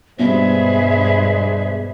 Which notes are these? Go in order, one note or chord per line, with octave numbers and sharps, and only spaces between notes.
G2 B2 G#3 D4 G#4 B4 C5 E5